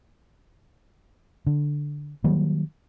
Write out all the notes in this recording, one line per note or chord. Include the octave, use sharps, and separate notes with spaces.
D3
D#3 F#3 G3 A#3